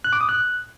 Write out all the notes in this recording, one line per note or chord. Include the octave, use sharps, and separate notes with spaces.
F#6
D6
D#6
F#6